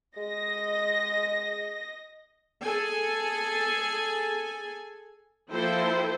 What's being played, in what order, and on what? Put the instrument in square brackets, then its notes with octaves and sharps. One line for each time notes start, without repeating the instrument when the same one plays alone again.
[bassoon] G#3 [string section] D#5 A#6
[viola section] G#4 A4 G#5
F3 A#3 E4 A4 C5 G5